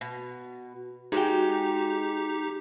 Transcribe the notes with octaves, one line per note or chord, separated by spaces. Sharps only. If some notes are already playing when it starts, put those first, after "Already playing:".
B2
G#3 D#4 F#4 G4 G5